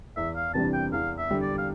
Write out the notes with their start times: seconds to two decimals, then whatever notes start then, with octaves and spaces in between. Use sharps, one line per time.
0.16 E2 E5
0.36 F5
0.54 C3 E3 G3 D4 A5
0.73 G5
0.92 E2 F5
1.18 E5
1.31 D3 G3
1.42 D5
1.58 F5